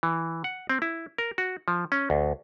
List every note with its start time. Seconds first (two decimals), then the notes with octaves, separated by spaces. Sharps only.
0.03 E3
0.44 F#5
0.69 C4
0.82 E4
1.18 A#4
1.38 F#4
1.68 F3
1.92 C#4
2.10 D2